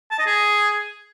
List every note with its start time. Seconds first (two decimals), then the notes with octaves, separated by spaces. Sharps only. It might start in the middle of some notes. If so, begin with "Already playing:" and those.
0.11 A5
0.19 D#5
0.27 G#4